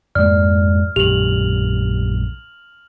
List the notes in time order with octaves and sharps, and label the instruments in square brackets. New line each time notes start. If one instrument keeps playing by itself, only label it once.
[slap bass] F2 G#2 A#3 [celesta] D5 [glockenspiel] F6
[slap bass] A#1 F#2 [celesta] G4 [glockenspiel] F7 F#7